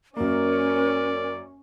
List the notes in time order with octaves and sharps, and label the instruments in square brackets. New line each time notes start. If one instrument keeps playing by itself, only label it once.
[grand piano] F#2 A#3 [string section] C#4 [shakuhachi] A#4 [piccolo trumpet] D5